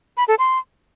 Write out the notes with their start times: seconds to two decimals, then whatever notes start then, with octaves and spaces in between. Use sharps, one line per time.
0.17 B5
0.28 A4
0.39 C6